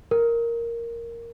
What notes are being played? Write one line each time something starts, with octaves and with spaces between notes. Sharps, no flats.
A#4